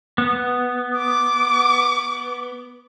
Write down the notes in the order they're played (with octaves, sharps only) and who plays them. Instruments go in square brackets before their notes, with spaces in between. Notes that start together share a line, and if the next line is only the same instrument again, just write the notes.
[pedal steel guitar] B3
[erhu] D6